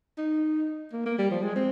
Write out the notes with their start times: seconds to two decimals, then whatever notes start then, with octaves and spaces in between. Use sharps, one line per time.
0.18 D#4
0.92 A#3
1.06 A#3
1.18 G3
1.31 F3
1.42 G#3
1.55 C4